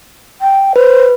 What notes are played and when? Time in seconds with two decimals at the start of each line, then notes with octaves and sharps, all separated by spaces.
0.41 G5
0.76 B4 C5